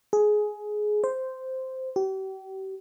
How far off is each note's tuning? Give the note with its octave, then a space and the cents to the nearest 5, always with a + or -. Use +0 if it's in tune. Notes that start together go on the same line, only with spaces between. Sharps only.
G#4 +15
C5 -5
G4 -40